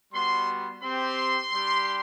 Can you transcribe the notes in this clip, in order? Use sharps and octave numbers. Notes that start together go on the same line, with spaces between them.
G3 B3 F#4 C6
C4 G4 C6
G3 D4 G4